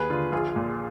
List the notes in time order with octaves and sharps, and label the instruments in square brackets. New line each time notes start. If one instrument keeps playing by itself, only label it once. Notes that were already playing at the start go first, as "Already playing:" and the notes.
Already playing: [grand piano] D#2 G#4 B4
D3 F4
A#1 F4 G#4
A#2